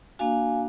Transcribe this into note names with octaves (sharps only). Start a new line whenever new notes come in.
A#3 D4 F#4 F5 G#5